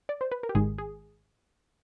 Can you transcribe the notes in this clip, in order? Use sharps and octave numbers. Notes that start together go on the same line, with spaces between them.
D5
C5
B4
A#4
G4
G#1 G#2 D#3 G#3 G#4
G#4